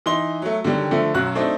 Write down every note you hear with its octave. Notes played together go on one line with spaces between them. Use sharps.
E3 D#4 C6 G7
F#3 A3
D3 D#3 F#3 G3
D3 F3 A3
B1 F#2 F#3 F#4 F#6
A3 C4 D4 D#4